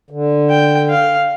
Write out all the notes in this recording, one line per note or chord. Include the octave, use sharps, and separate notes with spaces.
D3
G5
F5